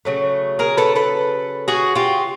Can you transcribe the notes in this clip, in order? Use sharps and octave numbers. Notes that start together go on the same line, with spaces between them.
C#3 F#3 A3
G#4 A#4
A4 B4
A4 B4
F#4 G#4
F4 G4